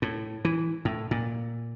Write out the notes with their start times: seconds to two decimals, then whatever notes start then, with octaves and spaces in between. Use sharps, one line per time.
0.02 A2
0.45 E3
0.85 A2
1.11 A#2